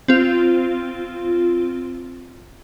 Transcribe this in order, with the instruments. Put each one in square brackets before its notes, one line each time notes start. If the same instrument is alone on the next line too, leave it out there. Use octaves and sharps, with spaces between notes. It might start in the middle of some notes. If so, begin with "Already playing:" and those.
[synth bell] C4 F4